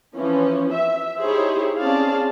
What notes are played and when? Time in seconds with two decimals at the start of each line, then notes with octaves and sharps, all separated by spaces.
0.15 E3 F3 C#4
0.73 E5
1.20 D#4 E4 G4 G#4 C5 C#5
1.81 C4 C#4 G#4 D5 F5 A5